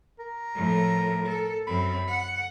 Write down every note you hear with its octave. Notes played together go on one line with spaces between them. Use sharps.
A#4
A2 F3
A4
F#2 C4 B5
F#5